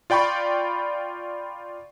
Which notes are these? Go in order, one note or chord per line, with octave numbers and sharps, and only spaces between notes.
F4 D5 G5 B5 C#6